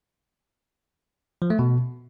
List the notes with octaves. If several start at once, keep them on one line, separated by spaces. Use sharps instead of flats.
F3
A3
B2